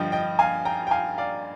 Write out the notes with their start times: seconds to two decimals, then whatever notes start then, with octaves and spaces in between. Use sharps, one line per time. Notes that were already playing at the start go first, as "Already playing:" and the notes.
Already playing: G2 D3 F3 D#5 G5
0.12 D#5 G5
0.39 F5 G#5
0.65 G5 A#5
0.87 G5
0.91 F5 G#5
1.18 D5 F5